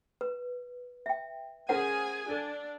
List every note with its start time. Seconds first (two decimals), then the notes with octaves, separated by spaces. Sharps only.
0.21 B4
1.06 E5 G5
1.69 C#4 G#4 A#4 C5 F#5 G#5
2.30 D4 A4